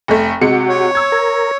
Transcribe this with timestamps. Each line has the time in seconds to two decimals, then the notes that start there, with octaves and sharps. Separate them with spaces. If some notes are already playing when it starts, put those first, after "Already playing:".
0.08 F1 A3
0.41 C3 G#3 F#4 C#7
0.69 C#5
0.95 E6 G#6
1.12 A#4